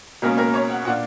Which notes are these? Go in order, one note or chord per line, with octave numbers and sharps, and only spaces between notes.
C#2 B2 F#3 A#3 C#4 A#4
A#4
C#5
F#5
A#2 A#3 D4 F#5